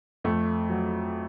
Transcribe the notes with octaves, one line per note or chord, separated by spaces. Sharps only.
F2 A3
F#3